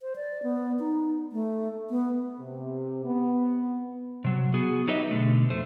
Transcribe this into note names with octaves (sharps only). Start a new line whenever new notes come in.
C5
D5
B3
D#4
A3
B3
C3
B3
C3 F#3
B3 F#4 G#4
F#3 D#4 G4 B4 D#5 E5
B2 D3 A3
F2 A3 C5